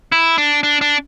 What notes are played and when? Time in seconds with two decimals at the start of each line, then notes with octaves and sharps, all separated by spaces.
0.12 E4
0.38 D4
0.63 D4
0.81 D4